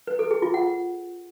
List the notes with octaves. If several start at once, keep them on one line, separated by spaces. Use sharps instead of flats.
B4
A4
G#4
F4
F#5